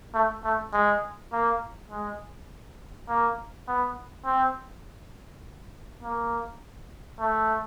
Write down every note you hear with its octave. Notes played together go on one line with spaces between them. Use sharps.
A3
A3
G#3
A#3
G#3
A#3
B3
C4
A#3
A3